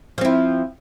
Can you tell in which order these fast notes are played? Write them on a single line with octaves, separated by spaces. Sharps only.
F3 C4 E4